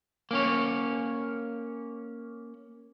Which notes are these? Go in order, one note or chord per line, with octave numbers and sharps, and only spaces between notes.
A#3 C#4 C#5